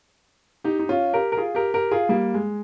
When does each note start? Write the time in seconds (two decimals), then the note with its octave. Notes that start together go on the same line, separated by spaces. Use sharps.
0.64 D#4 G4
0.79 D#4
0.89 C#4 F4
1.13 G4 A#4
1.32 A#4
1.37 F4 G#4
1.55 G4 A#4
1.74 G4 A#4
1.91 F4 G#4
2.09 G3 A#3
2.34 G#3